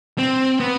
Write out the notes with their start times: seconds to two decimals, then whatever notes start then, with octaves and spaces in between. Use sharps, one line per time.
0.18 C4
0.60 B3